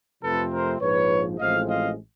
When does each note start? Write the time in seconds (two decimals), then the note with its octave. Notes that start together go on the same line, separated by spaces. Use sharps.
0.22 F2 C3 F3 A3 C4 A4 B4
0.51 A#4 C5
0.81 A#1 G#2 F3 B4 C#5
1.38 A1 A2 F3 G#3 C4 D#5 F5
1.67 D#5 F5